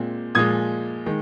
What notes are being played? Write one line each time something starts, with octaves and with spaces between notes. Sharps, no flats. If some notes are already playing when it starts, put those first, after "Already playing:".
Already playing: A#2 G#3 C4
A#2 F3 G#3 D#6 G#6
D#3 G#3